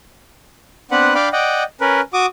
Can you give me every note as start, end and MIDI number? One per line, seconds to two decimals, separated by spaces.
0.91 1.14 59
0.91 1.14 60
0.91 1.14 62
0.91 1.14 71
0.91 1.14 78
1.15 1.29 62
1.15 1.29 74
1.15 1.29 77
1.15 1.29 79
1.15 1.29 83
1.32 1.64 74
1.32 1.64 75
1.32 1.64 78
1.32 1.64 79
1.81 2.01 61
1.81 2.01 70
1.81 2.01 71
2.13 2.26 66
2.13 2.26 86
2.13 2.26 87